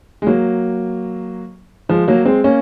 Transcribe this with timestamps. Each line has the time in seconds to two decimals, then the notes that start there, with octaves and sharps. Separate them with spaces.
0.22 G#3
0.27 F#3 A#3
1.89 F3 G#3
2.08 F#3 A#3
2.25 G#3 C4
2.44 A#3 C#4